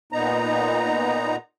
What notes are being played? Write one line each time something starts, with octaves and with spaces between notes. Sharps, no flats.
A#2 B3 D#4 A#5